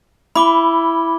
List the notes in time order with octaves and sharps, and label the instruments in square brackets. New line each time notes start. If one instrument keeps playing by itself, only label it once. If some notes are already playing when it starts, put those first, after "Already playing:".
[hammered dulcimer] E4 [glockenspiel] B5 D6 G7